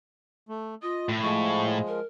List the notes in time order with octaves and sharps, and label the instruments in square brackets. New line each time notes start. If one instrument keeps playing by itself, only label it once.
[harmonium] A3
[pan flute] F4 [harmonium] D#5
[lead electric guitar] A2
[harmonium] F3 G#3 [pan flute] C#6
[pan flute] A#4